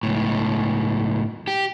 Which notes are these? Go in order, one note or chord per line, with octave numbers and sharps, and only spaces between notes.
C#2 A2
G4